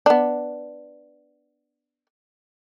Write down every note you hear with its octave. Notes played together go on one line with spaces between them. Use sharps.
B3 D4